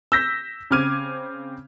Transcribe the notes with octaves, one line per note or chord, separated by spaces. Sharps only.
E6 G6 A#6 B6
C#3 C4 D6 F6 G#6 D#7